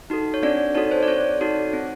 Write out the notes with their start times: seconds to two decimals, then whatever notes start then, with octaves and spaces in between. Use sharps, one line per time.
0.10 D#4 F#4 A4
0.34 C#5
0.43 C4 D4 D5
0.75 D#4 F#4 A4 C#5
0.91 C5
1.03 D5
1.08 C4 C#5
1.41 D#4 F#4 A4
1.73 C4